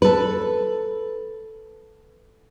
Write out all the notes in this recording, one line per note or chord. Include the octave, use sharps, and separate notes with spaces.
A4 B4